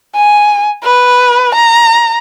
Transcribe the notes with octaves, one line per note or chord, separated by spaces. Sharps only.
G#5
B4
A#5